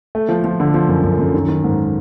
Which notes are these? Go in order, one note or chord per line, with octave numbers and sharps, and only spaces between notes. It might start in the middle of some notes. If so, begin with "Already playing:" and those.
A3
F3
F3
D3
F3
F#2
F#2
F#2
D#3
D#3
G#2